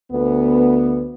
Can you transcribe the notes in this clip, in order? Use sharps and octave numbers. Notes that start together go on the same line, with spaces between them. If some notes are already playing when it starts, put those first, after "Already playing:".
D2 B3